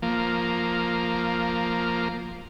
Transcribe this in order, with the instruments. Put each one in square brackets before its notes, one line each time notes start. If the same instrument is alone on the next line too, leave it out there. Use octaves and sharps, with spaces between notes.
[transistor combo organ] F3 A#3